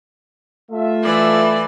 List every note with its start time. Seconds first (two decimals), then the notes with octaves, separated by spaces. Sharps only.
0.71 A3 F4 E5
1.03 E3 D5